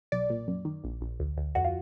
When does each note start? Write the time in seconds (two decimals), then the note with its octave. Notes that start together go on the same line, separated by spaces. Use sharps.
0.12 B1 D5
0.30 A#2
0.48 F#2
0.65 D#3
0.84 A#1
1.01 A#1
1.19 D2
1.37 D2
1.55 F2 F#4
1.64 F4